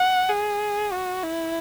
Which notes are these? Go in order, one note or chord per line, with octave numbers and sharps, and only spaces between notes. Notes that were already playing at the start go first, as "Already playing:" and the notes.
Already playing: F#5
G#4
F#4
E4